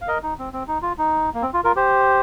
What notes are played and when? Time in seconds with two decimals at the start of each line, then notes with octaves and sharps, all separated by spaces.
0.01 F5
0.08 A#4 D#5
0.23 D#4
0.39 C4
0.53 C4
0.68 D#4
0.82 F4
0.98 D#4
1.34 A#3
1.42 C4
1.53 F4
1.64 F4 A#4
1.76 G4 C5